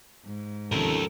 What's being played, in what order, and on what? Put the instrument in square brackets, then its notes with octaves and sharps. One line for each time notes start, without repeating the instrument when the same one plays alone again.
[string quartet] G#2
[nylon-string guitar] C3 D#3 [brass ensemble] F3 C#4 A4 [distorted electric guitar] G4 A#4